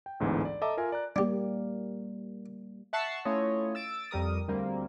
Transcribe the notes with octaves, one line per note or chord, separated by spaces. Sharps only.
G5
A1 D2 G#2 D3 E3 B3
D5
A4 D#5 E5 A5 A#5 D6
F4 A#4 E5 G#5
D5 A#5 F#6
G3 A#3 D4 G4
E5 F#5 A5 C#6 E6 C7
A3 C#4 E4 F4 C#5 D#5
E6 A6 D7
F2 G3 A#4 D#6
D2 G3 A#3 C4